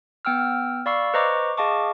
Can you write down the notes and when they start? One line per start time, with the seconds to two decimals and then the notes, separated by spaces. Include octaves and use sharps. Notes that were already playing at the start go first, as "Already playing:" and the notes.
0.25 B3 G5 E6 F6
0.86 D5 F5 B5 C#6 E6 C7
1.14 B4 C5 D#5 A#5 C#6 D6
1.57 G#4 D#5 F5 A5 C#6 D6